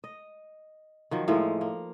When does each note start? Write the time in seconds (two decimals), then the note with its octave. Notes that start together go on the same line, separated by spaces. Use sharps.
0.04 D#5
1.11 D#3 F3 F#3
1.28 A2 F3 G#3 A#3
1.61 A#3